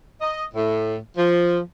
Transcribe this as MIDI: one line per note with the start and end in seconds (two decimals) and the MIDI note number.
0.20 0.44 75
0.54 0.94 45
1.17 1.58 53